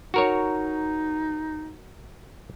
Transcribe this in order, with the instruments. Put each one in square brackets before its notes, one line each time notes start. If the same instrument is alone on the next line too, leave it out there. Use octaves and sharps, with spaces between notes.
[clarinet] D#4 [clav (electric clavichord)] F#4 A#4 C#5